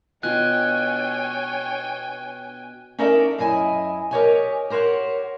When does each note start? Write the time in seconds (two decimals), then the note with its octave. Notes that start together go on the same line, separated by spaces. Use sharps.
0.23 B2 D4 F4 C#5 G5 G#5 F#6
2.98 C#4 D#4 A4 A#4 D5 E5
3.38 F#2 E4 D#5 G#5
4.11 G4 A#4 C5 C#5 D#5 G#5
4.70 G4 A#4 C5 C#5 F#5